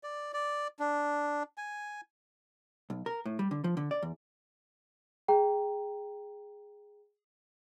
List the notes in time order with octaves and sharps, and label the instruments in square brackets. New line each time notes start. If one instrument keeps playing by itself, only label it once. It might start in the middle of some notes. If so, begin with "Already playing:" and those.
[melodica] D5
D5
D4
G#5
[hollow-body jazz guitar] B1
A#4
A2
G3
D3
F3
D3
D5
E2
[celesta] G#4 G5 A#5